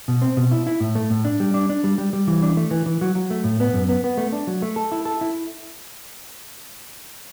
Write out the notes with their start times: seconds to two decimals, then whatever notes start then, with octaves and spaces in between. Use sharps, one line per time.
0.08 B2
0.22 C4
0.37 B2
0.52 E4
0.67 E4
0.80 A2
0.95 A3
1.10 A2
1.25 D4
1.40 G3
1.54 D4
1.69 D4
1.84 G3
1.98 G3
2.13 G3
2.27 E3
2.42 D4
2.57 A3
2.71 E3
2.86 E3
3.01 F#3
3.15 F#3
3.31 A3
3.44 A2
3.60 B3
3.73 F#2
3.89 B3
4.04 B3
4.17 A3
4.33 D4
4.47 F#3
4.62 A3
4.76 A4
4.92 E4
5.05 A4
5.21 E4